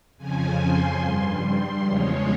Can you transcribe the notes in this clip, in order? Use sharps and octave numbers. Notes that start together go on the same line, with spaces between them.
F2 C#3 F3 G#5
C6
G2 G3 C6
E2 C#3 F3 G#3 C#5